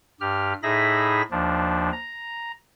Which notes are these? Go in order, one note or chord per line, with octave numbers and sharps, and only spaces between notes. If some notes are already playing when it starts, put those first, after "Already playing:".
G2 G4 F6
A2 D#4 G#4 E5 B5 A#6
D#2 F3 D4
A#5